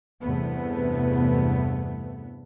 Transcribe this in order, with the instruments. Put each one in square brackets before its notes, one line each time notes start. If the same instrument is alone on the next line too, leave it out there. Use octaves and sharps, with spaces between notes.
[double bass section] E2 G2 C3 A3 B3